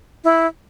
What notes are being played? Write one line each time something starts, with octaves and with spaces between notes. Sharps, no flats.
E4